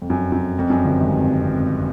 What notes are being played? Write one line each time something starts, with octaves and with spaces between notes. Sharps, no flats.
F2
F#2
F#2
F2
F#2
G1 G2
G#1 G#2